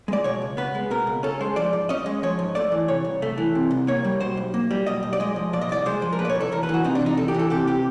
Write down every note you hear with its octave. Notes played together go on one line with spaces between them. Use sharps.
G#3 D5
B2 C#5
C#2
B3 B4
G#3
B2 A#4
C#2
C#4 A4
G#3 C5
F3 D5
G#2
C#4 D#5
G#3
F3 C#5
G#2
A3 D5
E3
C3 C#5
C2
A3
E3
C3
C2
A#3 C#5
G3
B2 C5
B1
A#3
G3
B2 D#5
B1
D5
G#3 D#5
F3
A#2 D5
D#5
C2 D5
G#3 C5
F3
A#4
A#2 B4
D5
C#5
C2
A4
E2 A#4
B4
E3 F#4
C3 D#4
D4
E2
D#4
E2 A4
G4
E3 A4
C3 G4
G4